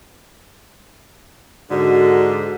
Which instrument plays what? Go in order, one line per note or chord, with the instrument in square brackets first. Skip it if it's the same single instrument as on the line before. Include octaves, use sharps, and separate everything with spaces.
[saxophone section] G#2 D3 [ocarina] F#4